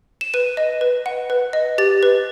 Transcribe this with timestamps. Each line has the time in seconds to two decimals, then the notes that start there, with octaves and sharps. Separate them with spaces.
0.21 E7
0.34 B4 D#7
0.57 D#5
0.81 B4
1.06 F#5
1.30 B4
1.53 D#5
1.78 G4 A6
2.03 B4